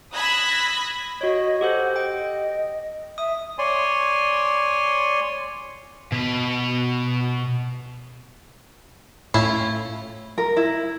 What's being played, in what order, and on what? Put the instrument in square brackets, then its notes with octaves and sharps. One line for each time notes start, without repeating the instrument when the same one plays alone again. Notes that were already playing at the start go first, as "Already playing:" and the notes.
[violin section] B5 D#6 E6 F#6 G#6 A#6
[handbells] F#4 C#5 [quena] D#5
[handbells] G4 A4 C5 [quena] F#5
[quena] D#5 [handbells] G5
[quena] E5 [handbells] D#6
[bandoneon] C#5 D5 G#5 C6
[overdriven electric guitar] B2 B4
[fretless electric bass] A2 [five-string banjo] C#4 E4 F4
[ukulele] A#4
E4